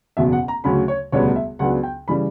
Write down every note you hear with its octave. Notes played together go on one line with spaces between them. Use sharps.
F#1 E2 B2 E5
F#5
A#5
D2 C#3 F#3 C#4 B5
C#5
E1 D2 C#3 G3 B3 C#5
E5
C#2 C#3 F#3 B3 D4 F#5
G5
C#3 E3 G3 B5